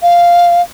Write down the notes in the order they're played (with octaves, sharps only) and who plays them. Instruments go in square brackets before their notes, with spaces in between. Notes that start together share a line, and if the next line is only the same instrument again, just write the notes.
[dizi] F5